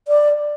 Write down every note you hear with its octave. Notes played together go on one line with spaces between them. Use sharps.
D5